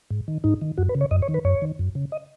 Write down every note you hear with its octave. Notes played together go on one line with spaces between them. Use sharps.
G#2
D#3
G#2 D#4
D#3
F#2 F#4
B4
C#3
C#5
F#2 D#5
C#5
D#3
B4
F#2 C#5
D#3
F#2
C#3
D#5